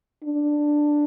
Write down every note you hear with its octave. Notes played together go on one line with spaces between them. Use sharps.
D4